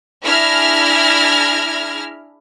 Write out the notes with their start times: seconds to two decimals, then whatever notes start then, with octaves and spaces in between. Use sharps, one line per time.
0.24 D4 E4 G#4 F6 G#6 A#6